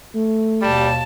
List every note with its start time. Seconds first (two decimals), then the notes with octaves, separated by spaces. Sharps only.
0.15 A3
0.62 D#2 B2 G3 A5